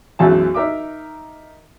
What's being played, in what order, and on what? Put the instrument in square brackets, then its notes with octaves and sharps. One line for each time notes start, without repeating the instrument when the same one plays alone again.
[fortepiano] B1 F#2 E3 G#3 A5
D#4 A#4 E5 D6